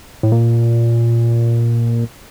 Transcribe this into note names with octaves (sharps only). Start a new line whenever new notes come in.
A2
A#2